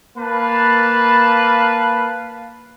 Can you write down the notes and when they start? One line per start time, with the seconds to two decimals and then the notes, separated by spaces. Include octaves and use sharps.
0.16 A#3 B4 F5 A5 B5